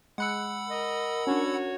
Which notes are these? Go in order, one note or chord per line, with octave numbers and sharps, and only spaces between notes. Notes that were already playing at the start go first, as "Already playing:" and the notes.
G#3 F#5 B5 E6 F#6 C#7
A#4 D#5
C#4 D4 F#4 C#5